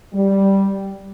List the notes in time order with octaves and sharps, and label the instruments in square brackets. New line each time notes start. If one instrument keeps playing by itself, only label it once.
[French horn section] G3